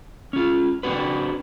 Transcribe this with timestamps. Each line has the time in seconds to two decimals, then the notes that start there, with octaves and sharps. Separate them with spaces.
0.33 C#4 F4
0.83 C4 D4 F#4 B4